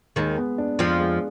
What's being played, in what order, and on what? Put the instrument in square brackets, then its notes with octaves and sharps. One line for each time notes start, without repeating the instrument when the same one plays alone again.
[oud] D#2 D#3 [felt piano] G#3
[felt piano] B3
D4
[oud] F2 F3 [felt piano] F4
[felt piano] G#3